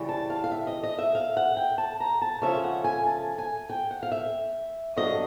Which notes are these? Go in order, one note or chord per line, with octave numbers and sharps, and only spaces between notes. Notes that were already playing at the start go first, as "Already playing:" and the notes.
Already playing: C#3 E3 G3
A5
F5
F5
E5
D#5
D#5
E5
F5
F#5
G5
A5
A#5
A5
C#3 F3 A3 C#4 E5
F#5
G#5
A5
G#5
G5
F#5
F5
E5
G2 D3 F#3 D#5